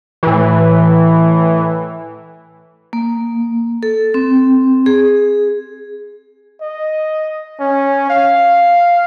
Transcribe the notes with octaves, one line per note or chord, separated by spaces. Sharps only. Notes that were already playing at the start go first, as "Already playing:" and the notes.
A2 E3
A#3
A4
C4
G#4
D#5
C#4
F5